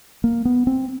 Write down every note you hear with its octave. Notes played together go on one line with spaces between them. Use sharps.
A#3
B3
C4